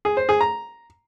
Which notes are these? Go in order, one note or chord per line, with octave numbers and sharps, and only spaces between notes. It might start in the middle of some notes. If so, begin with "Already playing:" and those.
G#4
C5
G#4
A#5